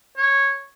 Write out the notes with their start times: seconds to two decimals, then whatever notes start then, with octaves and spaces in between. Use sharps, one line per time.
0.17 C#5